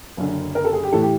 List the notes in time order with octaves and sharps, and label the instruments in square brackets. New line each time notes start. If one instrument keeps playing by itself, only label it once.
[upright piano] F#1 F#2 D3
A#4
A4
G#4
G4
A2 E3 A4
G4